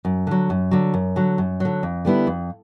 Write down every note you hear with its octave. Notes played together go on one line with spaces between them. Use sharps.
F#2
D3 F#3
F#2
D3 F#3
F#2
D3 F#3
F#2
D3 F#3
F2
D3 G3 B3 E4
F2